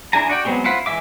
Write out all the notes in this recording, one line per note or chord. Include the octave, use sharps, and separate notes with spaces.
D4 E4 G#4 G#5 A#5
F#4 D5 G5
F#3 G#3 B3 C4 G4
E4 F4 C5 F#5 B5
E3 G#3 E5 D6